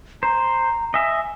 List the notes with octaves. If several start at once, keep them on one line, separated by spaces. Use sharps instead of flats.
C5 A#5
D#5 E5 G#5